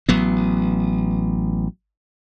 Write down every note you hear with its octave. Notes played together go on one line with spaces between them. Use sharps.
A1 F#3 B3